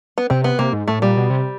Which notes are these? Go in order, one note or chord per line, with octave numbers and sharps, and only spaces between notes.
B3
C3 C4
B3
C3 A#3
G#2
A2 A3
A#2 G3
B2
C3